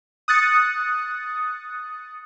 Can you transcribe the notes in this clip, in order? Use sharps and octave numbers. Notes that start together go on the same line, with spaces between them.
D#6 F#6 A6 C#7